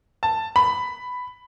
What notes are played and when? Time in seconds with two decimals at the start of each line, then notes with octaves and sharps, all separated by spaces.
0.23 A5
0.56 B5